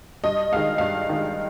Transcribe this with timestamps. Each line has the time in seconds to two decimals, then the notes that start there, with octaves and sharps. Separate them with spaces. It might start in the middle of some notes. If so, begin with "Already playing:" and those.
0.24 G2 D#5
0.52 D#3 G#3 F5
0.78 G2 F5
1.09 D#3 G#3